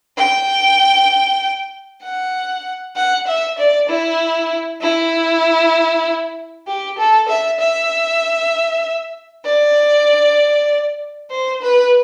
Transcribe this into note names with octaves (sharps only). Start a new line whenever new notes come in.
G5
F#5
F#5
E5
D5
E4
E4
G4
A4
E5
E5
D5
C5
B4